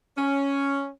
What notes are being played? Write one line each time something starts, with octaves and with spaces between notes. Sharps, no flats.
C#4